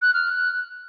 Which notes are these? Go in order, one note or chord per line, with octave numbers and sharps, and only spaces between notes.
F#6
F6
F#6